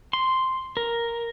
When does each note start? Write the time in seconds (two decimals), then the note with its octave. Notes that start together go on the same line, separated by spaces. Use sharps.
0.13 C6
0.77 A#4